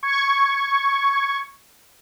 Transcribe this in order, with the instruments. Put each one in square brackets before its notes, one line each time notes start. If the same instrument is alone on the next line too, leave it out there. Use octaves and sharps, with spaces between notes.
[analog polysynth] C#6 G#6